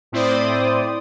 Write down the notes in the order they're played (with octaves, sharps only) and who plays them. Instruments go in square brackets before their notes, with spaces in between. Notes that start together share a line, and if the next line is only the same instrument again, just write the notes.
[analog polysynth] A2 C4 E4 C5 D5 D#6